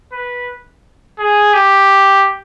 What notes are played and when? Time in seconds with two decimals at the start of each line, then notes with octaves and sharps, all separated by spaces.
0.12 B4
1.19 G#4
1.53 G4